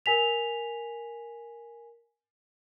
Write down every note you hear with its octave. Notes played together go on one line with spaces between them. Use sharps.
A#4 G#5 B6 F7